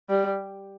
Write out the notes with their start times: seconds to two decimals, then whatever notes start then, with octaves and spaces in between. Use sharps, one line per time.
0.09 G3